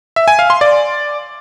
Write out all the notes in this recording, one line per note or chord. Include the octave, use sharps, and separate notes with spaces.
E5
G#5
F5
C6
D5